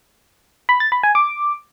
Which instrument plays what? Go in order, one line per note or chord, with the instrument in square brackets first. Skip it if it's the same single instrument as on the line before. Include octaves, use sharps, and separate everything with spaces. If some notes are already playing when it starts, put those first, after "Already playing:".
[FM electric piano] B5
A6
B5
G#5
D6